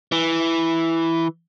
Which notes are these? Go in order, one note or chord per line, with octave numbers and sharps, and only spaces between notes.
E3